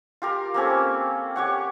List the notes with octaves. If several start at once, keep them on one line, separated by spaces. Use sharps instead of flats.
F4 G4 A#4
A#3 C4 C#4 A4
G4 C#5 F#5